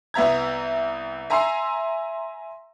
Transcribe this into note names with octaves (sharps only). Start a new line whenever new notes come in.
C2 B3 E5 A#5 G#6
E5 G#5 A#5 C6 E6 C7